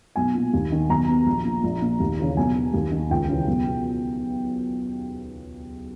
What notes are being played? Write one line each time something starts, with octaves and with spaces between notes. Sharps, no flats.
B1 G#5
A#2
D#2
D#3
B1 A#5
B2
A#1
A#2
A#1
A#2
D#2
C#3 E3
B1 G#5
B2
D#2
D#3
C#2 G5
C#3 E3
B1
B2